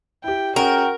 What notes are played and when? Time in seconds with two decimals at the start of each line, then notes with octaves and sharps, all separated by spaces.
0.24 E4 G4 G5
0.56 C#4 F#4 G#4 A#4 G5